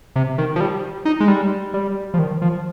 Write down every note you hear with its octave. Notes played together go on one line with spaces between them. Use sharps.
C3
D#3
F3
G3
D#4
G#3
G3
G3
F3
D#3
F3